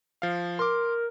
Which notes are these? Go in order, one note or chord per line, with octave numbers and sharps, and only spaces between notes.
F3 F5
A#4 C6 D6